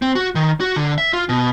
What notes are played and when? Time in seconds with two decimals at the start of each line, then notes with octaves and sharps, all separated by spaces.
0.02 C4
0.15 F#4
0.35 D#3
0.60 F#4
0.76 D3
0.98 E5
1.13 F4
1.29 B2